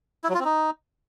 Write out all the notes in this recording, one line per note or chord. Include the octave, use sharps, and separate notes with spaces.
E4
F#3
F4
C4
D#4